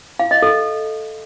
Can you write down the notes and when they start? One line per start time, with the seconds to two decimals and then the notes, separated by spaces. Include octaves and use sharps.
0.19 F5
0.31 D#5
0.42 A4